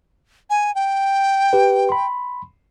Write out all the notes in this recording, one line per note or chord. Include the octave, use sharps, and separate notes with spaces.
G#5
G5
G4 B4
B5 C6